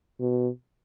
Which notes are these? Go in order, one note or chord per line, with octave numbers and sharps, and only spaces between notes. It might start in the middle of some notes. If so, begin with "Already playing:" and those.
B2